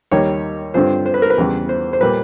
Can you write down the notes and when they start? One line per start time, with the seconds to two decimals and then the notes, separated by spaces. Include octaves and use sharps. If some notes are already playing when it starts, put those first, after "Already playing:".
0.12 D#2 D#3 G3 A#3 C#5
0.74 G2 D3 G3 C4 F4 C5
1.06 C5
1.14 B4
1.22 A#4
1.30 B4
1.38 E2 C#3 E3 G3
1.69 C5
1.93 C5
2.01 A#2 G3 A#3 B4